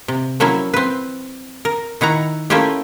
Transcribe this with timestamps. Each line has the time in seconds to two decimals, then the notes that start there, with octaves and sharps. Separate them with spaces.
0.08 C3
0.40 F3 F#3 A#3 C#4 E4
0.74 C4 B4
1.65 A#4
2.01 D#3 E4 F#5 A#5
2.50 A3 A#3 C#4 E4 F4 G4